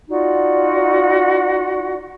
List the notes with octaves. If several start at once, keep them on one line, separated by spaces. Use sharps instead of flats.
D#4 F4 F#4 D5